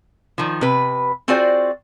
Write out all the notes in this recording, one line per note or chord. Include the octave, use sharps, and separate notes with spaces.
D#3 F3
C3 B4
C4 F4 F#4 G#4 C5 D5